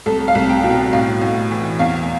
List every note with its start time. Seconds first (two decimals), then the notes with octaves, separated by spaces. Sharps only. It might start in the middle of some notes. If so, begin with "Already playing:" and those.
0.06 C2 A4
0.28 F5
0.35 C2
0.50 G5
0.64 B2
0.72 G5
0.93 A2 F5
1.21 A2
1.51 E3
1.79 E2 F5